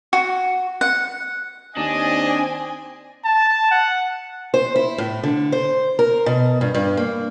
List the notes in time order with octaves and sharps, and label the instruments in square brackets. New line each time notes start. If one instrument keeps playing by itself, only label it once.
[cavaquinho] F#4
F#5
[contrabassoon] D#2 [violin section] C4 G#5 [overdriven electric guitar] D4 [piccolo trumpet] D#5
[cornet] A5
F#5
[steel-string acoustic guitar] C5
E4
A2
D3
C5
A#4
B2
G2
G2
A#3